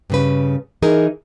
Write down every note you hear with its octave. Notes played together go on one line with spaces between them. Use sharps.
G2 C#3 B4
E3 D#4 G#4 A#4